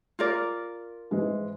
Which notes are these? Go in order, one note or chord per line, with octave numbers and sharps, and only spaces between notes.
F4 A#4 D5
G#2 E3 G#3